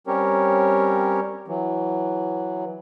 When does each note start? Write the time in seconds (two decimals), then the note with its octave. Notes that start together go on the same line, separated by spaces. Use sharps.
0.07 G3 C4 C#4 G4 A#4 C#5
1.48 E3 F#3